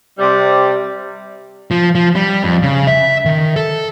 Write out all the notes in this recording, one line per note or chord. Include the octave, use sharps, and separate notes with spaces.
C3 G3
F3
F3
G3
F2
C#3
E5
D#3
A4